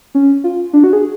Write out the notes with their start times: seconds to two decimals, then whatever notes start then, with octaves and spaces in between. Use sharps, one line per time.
0.15 C#4
0.44 F4
0.73 D4
0.84 F#4
0.93 G#4